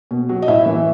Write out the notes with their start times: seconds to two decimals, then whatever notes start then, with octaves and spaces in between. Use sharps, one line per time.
0.11 B2
0.29 F#3
0.42 D#5
0.48 A2 E4 E5
0.66 E3